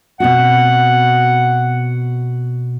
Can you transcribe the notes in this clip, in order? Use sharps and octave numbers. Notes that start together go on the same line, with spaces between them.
B2 C4 F#4 F#5